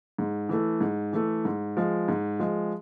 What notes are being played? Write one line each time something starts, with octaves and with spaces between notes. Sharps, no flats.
G#2
E3 A3
G#2
E3 A3
G#2
F3 G#3
G#2
F3 G#3